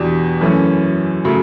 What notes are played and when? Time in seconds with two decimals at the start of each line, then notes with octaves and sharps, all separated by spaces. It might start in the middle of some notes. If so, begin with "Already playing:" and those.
Already playing: E2 B2 D4 G4
0.41 F#2 E3 A3 C#4
1.24 C#3 F#3 A3